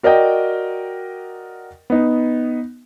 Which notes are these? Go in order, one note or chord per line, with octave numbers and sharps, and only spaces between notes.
F#4 A#4 D5 D#5 G5
B3 D#4